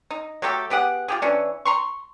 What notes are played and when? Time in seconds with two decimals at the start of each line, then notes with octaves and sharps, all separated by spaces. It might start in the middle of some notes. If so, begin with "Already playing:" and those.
0.10 D#4
0.42 F#3 A3 G4 A4
0.70 B3 G4 G#4 F#5
1.08 F4 G4 G#4
1.22 E3 C#4 D4
1.65 A#5 C6 C#6